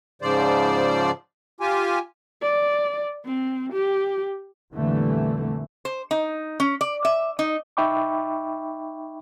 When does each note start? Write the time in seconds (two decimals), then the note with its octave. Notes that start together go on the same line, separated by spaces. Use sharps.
0.22 G#2 C#3 F3 C5 D5
1.60 F4 G4 G#5
2.42 D5
3.25 C4
3.73 G4
4.74 F2 A#2 D3 E3 G3 A3
5.85 C5
6.11 D#4
6.60 C#4
6.81 D5
7.05 E5
7.39 D#4
7.77 D#4 E5 G5 B5 C#6 D6